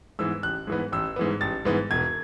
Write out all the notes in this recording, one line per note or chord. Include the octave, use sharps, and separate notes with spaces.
G#2 E3 B3 E6
A1 F#6
G#2 E3 B3
A1 E6
G#2 E3 B3
A1 A6
G#2 E3 B3
E1 G#6